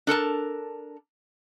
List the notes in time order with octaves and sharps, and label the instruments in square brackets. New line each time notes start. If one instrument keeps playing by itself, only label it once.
[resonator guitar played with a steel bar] D4 A4 A#4 A5